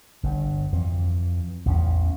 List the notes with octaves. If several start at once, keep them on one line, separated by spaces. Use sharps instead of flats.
G1 G2
F2 E3
A1 E2 C4 C#4